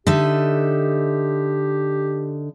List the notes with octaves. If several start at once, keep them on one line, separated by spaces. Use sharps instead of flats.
D3 D#4 G4 E5